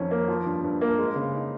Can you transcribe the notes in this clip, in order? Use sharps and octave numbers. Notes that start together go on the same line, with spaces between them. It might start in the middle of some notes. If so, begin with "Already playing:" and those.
Already playing: F2 D#3 C#4
A#3
F3
G2
G2
A#3
G#3
C#3
D#4